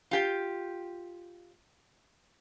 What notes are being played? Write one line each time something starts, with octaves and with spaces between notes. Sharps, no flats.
F4 G4 G5